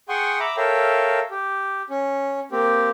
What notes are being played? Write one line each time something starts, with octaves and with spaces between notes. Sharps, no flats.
G#4 F#5 G5 C6 C#6 D#6
E5 A#5 B5 D6
A4 A#4 C#5 E5 F5 G5
G4
C#4
A#3 C4 G4